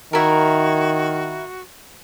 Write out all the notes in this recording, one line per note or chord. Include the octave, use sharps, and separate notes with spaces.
D#3 E4 F#4 A#4